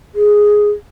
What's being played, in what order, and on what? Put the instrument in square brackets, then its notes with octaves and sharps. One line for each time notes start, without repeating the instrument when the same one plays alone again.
[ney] G#4